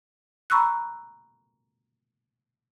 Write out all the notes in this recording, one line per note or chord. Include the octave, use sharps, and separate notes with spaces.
A#5 B5 C#6 E6 F#6